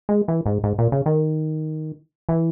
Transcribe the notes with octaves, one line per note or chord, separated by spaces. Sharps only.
G#3
E3
G#2
G#2
A#2
C#3
D#3
E3